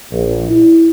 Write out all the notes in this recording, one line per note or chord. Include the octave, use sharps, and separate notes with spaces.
A#1
E4